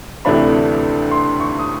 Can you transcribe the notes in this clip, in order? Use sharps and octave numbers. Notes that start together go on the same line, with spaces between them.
D2 C3 E3 A3 D4 B5
C6
C#6
D#6